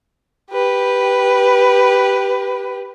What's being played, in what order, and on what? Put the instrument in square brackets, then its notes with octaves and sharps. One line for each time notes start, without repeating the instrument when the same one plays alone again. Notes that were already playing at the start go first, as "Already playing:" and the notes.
[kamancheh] G4 B4